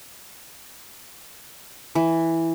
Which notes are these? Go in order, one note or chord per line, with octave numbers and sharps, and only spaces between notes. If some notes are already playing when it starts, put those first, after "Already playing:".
E3